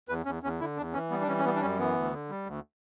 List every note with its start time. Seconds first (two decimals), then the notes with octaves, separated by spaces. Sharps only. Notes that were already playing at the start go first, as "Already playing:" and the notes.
0.09 E2 B4
0.25 E2 C#4
0.43 E2 C#4
0.60 D3 E4
0.77 E2 D4
0.93 E3 C#4
1.10 G3 B3
1.21 D4
1.28 E3 C#4
1.38 C#4
1.45 G3 B3
1.56 D4
1.61 F#2 C#4
1.78 E3 B3
1.96 D2
2.13 D3
2.30 G3
2.46 D2